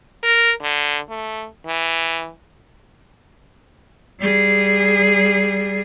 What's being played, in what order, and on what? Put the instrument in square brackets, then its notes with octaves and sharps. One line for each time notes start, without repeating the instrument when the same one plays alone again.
[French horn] A#4
D3
A3
E3
[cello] G3 G#4